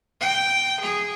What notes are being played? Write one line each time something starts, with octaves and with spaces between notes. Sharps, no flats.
G5
G#4